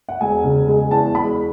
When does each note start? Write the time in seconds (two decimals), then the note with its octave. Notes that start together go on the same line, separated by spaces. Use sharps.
0.09 F#5
0.21 E1 G#5
0.44 C#3
0.68 G#3
0.91 E2 A5
1.15 E1 B5